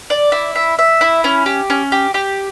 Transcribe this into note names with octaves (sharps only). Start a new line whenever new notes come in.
D5
E4
E5
E5
E4
C#4
G4
C#4
G4
G4